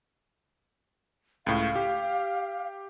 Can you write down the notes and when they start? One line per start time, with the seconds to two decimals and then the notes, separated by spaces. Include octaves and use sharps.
1.46 C#2 A2 F5
1.76 G4